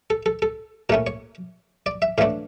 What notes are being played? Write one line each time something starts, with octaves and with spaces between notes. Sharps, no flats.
A4
A4
A4
A#2 A3 C#4 A#4
C#5
D5
E5
A2 E3 A3 D4 F5